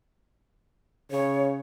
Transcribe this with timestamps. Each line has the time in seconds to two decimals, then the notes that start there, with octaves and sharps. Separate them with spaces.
1.11 C#3 C#5